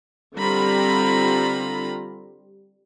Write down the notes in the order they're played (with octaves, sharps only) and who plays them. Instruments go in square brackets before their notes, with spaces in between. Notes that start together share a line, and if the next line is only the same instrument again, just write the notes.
[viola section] D3 G3 C4 F4 A#5 B5